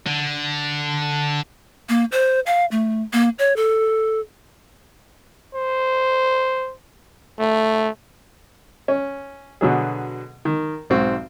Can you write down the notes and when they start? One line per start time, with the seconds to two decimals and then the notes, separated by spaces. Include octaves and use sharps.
0.07 D3
1.89 A#3
2.12 C5
2.46 F5
2.71 A3
3.13 A#3
3.39 C#5
3.56 A4
5.55 C5
7.40 A3
8.88 C#4
9.61 B2 D3 F#3 G#4
10.45 D#3
10.90 B1 G#2 C4 F#4